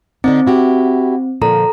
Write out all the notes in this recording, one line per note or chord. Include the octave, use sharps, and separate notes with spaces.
D3 C4 D4 D#4
E4 F#4 G4
A#2 D3 F3 A4 A#5